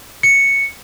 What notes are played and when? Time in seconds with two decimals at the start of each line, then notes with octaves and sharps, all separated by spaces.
0.23 C#7